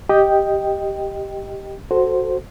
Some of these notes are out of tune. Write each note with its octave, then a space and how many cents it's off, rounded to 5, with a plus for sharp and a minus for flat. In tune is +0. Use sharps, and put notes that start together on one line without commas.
G4 +0 D#5 +0 G5 +5
F#4 +0 A4 +0 C5 +0